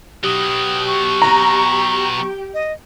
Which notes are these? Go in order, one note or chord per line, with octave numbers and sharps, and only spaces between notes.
B2 F#3 G4 D#6
C#6
A#5
D#5